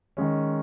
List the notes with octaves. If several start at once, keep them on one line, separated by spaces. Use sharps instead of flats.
D#3 G#3 C#4